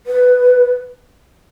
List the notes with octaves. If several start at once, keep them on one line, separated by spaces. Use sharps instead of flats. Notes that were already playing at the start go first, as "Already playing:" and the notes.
B4